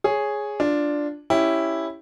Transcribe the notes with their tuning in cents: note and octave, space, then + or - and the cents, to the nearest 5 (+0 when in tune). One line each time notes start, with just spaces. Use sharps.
G#4 +0 C#5 +0
D4 +0 F4 +0
C#4 +0 E4 +0 G4 +0